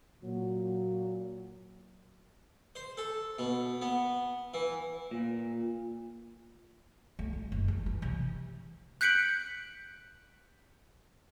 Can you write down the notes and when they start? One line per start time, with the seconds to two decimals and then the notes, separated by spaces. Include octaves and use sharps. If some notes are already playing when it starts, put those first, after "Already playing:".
0.22 A#2 F#3
2.76 C5
2.97 A4
3.39 B2
3.82 B3
4.54 E3
5.11 A#2
7.19 A3
7.33 C#3
7.52 F#1
7.68 G#3
7.86 E3
8.02 C3
9.01 F#6 G6 B6 C#7 D7 F#7